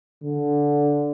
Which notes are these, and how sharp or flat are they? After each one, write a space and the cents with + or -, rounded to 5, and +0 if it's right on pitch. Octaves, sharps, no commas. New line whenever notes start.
D3 -10